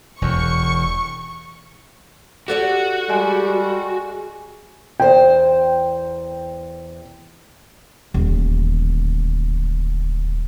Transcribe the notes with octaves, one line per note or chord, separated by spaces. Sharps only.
E1 E2 C#6
F#4 G4 A4 D5 F#5
G3 G#3
E2 C5 G5
D#1 D2